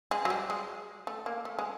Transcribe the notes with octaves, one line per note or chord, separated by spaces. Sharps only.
G#3
F#3
G3
G#3
A3
A#3
A3
G#3